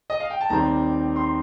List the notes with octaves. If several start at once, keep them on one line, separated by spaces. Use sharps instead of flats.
D#5
F5
G5
A5
D#2 D#3 G3 C4 A#5
C6